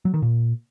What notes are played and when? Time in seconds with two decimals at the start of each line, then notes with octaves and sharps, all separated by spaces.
0.05 F#3
0.14 D#3
0.22 A#2